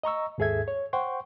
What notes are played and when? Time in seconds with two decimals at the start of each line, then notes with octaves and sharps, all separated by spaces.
0.03 D#5 A#5 C#6 E6
0.38 D#2 G#2 G#4 A4 E5 G#6
0.68 C#5
0.93 C5 F#5 G5 C6 C#6